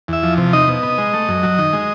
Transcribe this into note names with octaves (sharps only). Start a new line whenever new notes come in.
E2 E5
F3
C3
D#4 D#5
B2
B3
G#3
A3
F#2
F#3
D#3
G#3